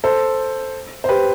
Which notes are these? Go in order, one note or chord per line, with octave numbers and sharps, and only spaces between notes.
A4 C5
C5
G4 B4